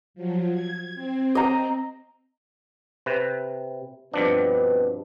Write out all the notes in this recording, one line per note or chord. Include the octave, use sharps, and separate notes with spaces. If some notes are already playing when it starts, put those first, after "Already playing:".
F3 F#3
G#6
C4
D#5 A#5
C3 B4
G2 B2 F3 C4 D4 B4